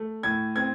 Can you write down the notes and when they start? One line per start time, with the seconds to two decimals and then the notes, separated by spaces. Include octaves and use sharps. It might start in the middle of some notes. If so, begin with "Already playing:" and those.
Already playing: A3
0.23 A2 G#6
0.56 C4 G#6